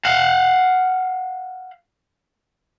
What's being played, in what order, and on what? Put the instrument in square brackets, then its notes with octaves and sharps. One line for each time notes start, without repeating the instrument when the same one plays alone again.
[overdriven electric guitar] F5 F#5